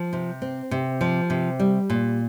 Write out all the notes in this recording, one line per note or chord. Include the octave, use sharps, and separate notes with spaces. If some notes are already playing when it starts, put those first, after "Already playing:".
Already playing: F3
C3
C4
C3
F3
C3
G3
A#2